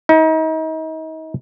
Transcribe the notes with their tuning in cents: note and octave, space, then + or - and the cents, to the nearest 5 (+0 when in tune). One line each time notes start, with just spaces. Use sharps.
D#4 +35